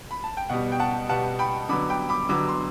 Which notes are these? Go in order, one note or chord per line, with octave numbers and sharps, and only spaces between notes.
B5
A5
G5
B2 G3 B3 F#5
G5
F#5 A5
B2 G3 B3 F#5 A5
G5 B5
D3 F#3 B3 B5 D6
G5 B5
B5 D6
D3 F#3 B3 B5 D6
C6